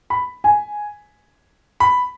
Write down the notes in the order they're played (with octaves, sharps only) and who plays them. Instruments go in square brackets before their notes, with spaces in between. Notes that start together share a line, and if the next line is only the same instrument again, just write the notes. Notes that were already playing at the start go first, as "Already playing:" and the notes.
[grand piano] B5
G#5
B5